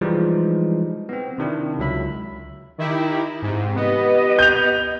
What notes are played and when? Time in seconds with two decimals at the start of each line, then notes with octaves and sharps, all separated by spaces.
0.01 E3 F3 G3 G#3 D#4
1.09 B3 C4
1.38 C3 D#3 D4 E4
1.79 C#2 F#3 E5 B5
2.78 D#3 E4 G4
3.42 G#2 C3
3.75 B3 G4 D#5
4.39 G6 F7